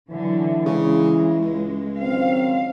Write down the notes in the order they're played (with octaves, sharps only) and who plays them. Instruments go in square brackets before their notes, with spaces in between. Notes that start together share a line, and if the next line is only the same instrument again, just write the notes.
[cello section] D3 F#3 [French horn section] E3
[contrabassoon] C#3 [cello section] G#3
[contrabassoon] C#2
[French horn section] D#3 F#3 C4 [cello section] F5